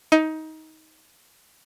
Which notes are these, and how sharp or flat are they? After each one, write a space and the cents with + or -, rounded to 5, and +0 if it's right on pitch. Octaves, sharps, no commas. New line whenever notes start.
D#4 +20